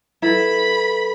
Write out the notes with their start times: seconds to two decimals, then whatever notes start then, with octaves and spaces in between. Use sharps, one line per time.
0.22 F#3 E4 A4 B4 B5